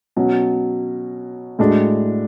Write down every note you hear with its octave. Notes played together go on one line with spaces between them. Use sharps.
B2 F#3 C#4
A2 G#3 D4 F#4